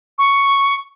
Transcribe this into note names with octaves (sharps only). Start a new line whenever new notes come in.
C#6